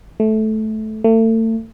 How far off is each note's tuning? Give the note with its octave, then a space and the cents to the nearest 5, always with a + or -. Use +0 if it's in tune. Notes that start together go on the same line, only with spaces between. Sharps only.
A3 -15
A3 +35